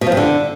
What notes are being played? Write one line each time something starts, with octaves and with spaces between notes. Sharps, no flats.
B2
F3
G2
D3